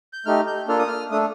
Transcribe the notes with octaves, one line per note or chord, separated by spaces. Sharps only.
G6
A3 D#4 G4 F6
G6
A#3 D4 F4 A4 F6
D#6
F6
A3 D4 A4 D#6